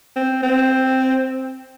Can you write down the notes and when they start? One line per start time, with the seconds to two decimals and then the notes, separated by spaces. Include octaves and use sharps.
0.16 C4
0.43 C4